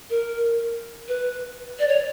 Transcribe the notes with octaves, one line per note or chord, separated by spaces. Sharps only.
A#4
B4
D5
C#5